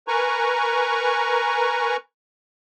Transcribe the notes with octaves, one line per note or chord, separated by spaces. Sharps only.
A#4 B4 G#5 A#5 C#6